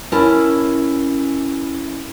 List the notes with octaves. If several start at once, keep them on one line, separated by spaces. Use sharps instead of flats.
C#4 E4 A#4 A5